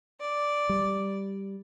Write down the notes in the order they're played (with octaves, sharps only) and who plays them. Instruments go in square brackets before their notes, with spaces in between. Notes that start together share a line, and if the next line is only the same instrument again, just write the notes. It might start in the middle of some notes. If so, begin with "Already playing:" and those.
[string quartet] D5
[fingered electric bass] G3